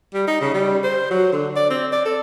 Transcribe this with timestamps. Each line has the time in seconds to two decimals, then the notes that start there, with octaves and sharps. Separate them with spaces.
0.14 G3
0.28 D#4
0.41 C#3
0.54 G3
0.83 C5
1.11 F#3
1.32 D3
1.56 D5
1.70 C4
1.92 D5
2.05 A4